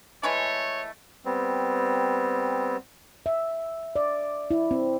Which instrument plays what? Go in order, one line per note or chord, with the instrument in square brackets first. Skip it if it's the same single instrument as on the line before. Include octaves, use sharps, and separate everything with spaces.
[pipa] E3 G#3 A3 [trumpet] C#5
[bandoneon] G3 B3 C4
[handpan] E5
D5
E4
C4